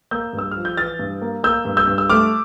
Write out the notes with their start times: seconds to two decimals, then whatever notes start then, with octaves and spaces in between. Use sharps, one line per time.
0.11 A#3 E6 G6
0.33 G2
0.39 E6
0.51 F3 F6
0.65 G6
0.77 E3 F6 A6
0.99 G2
1.21 A#3
1.43 A#3 E6 G6
1.65 G2
1.77 E6 G6
1.88 G2
1.98 E6
2.10 A3 D6 F6